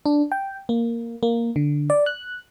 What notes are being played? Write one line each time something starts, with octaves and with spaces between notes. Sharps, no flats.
D4
G5
A#3
A#3
D3
D5
F#6